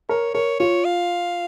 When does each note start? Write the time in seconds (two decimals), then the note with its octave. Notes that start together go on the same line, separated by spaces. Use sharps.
0.09 A#4 C#5
0.34 A#4 C#5
0.60 F4 C#5
0.85 F5